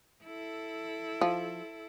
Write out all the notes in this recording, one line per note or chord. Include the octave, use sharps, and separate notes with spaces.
E4 A4
F3